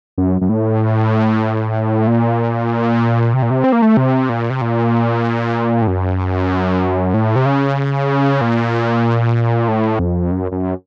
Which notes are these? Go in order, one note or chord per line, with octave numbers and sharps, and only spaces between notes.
F#2
F#2
A2
A#2
C3
A#2
C3
C4
A#3
A3
C3
A#2
C3
A#2
A2
F#2
A2
C3
C#3
A#2
A2
F2
F#2
F#2